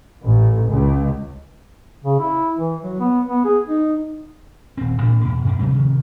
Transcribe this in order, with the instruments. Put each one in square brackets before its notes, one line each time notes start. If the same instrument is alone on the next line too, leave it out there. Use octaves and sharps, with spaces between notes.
[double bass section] A1
C#2
[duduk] C#3
E4
E3
F#3
B3
B3
G#4
D#4
[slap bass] D#1 C4
A1 A2 A#3 D4
E2 B2
F#2 B2
C3 F#3 A3 C4
C3 D#3 F3